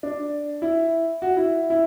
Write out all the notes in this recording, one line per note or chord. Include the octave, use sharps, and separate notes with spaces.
D4
E4
F#4
E4
E4